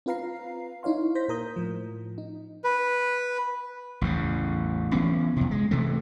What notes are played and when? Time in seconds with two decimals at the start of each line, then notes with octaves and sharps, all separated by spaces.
0.06 C4 F4 B4 F5 A#5 C7
0.83 D#4 E4 C#5 F5 C6
1.15 C5 G6 A#6 B6
1.28 A#2 A#4 D#6 G6
1.56 A2 F3
2.18 D#4
2.64 B4
4.01 A1 E2 C#3
4.92 E3 B3 C#4
5.36 F2 C3
5.51 G#3
5.71 C3 E3 A3